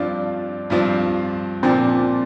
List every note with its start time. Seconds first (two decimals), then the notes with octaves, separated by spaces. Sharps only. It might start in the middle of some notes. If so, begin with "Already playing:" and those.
Already playing: G2 F3 C4 D4 F4 D5
0.70 G2 F3 C4 F4 D5
1.63 A#2 F3 C4 D4